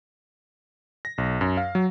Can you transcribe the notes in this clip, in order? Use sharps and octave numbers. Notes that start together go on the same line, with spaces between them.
A#6
B1
F#2
F5
F#3